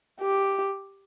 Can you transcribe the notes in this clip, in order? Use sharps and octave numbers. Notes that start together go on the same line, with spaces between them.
G4